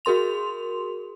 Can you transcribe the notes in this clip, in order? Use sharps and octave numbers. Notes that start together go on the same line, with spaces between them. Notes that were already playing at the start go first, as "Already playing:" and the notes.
F#4 G#4 A#4 C6 F7